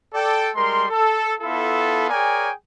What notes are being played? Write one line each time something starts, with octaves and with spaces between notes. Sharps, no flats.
A4 D5 G5
G3 G#3 A#4 C6
A4
B3 E4 F4 A4
G#4 A#4 C#5 D5 G5 G#5